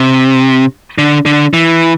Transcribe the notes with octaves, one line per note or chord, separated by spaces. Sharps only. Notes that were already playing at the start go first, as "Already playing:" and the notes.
Already playing: C3
D3
D3
E3